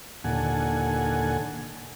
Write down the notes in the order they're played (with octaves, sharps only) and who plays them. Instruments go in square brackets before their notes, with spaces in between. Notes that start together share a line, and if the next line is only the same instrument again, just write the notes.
[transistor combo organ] D#2 A#2 D3 A4 F#5 G#5